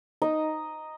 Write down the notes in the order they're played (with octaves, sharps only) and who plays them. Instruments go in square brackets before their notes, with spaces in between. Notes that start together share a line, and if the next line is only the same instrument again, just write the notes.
[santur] D#4 D#5